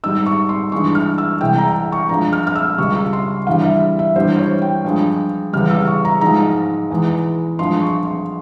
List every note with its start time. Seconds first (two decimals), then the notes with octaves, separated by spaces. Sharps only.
0.04 G#2 G3 E6
0.26 C#6
0.49 C6
0.72 G2 E3 G#3 C#6
0.95 F6
1.18 E6
1.41 C2 C3 E3 G#3 G5
1.58 A#5
1.92 C#6
2.09 G2 F3 G#3 A#5
2.33 F6
2.47 F6
2.55 E6
2.78 C#2 C#3 G3 C#6
3.13 C6
3.47 G2 E3 G3 F5
3.64 E5
3.99 E5
4.16 G2 E3 G3 C5
4.33 C5
4.38 C#5
4.62 G5
4.85 G2 F3 G#3
5.53 E2 C#3 G3 F6
5.70 E6
5.88 C#6
6.05 A#5
6.21 G#2 F3 G#3 A#5
6.90 E2 E3 G#3
7.59 G2 F3 G#3 C6
7.82 C#6
8.05 C6